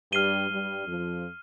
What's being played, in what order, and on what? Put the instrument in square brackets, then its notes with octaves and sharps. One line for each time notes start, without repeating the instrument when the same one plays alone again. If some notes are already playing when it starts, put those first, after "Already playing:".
[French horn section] G2 G3 [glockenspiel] F6 C7 D#7 G7
[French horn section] G2 G3
F2 F3